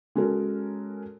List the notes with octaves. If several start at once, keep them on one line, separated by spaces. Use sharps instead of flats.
G#3 C#4 F#4 A4 A#4